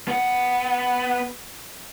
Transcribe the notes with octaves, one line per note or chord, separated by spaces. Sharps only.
B3 F#5